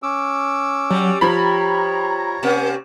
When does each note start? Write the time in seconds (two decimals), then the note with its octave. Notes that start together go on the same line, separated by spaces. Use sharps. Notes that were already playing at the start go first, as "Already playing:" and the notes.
0.03 C#4 D6 E6
0.90 F#3 G3
1.21 F3 C#5 A#5 B5
2.43 C3 A#3 C#4